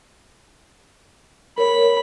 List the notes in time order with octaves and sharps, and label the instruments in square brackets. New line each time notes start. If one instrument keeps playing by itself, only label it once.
[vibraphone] A#4 C#5 [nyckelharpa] B5